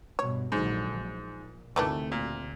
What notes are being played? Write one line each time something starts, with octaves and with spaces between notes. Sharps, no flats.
G2 B2 C#5
A#1 G#2 D3 F#3
A#2
D2 C3 D#3 E3 A3 D4
A#2